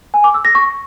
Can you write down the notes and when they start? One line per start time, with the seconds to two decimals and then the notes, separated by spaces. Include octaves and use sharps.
0.14 G#5
0.24 D6
0.34 E6
0.45 A#6
0.55 C#6